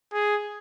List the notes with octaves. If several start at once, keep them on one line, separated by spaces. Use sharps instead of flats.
G#4